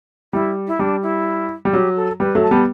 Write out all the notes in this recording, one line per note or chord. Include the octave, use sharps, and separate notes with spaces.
G3 E4
E4
G3 D4
E4
G3
F#3 G4
A4
G3 B4
F#3 A3
A5
G3 B3